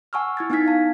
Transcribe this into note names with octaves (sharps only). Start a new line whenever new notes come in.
F#5 G#5 A5 C#6 E6 F6
E4 G#6 A6
B3 D#4 G#5 F6 G#6 B6
F5 A5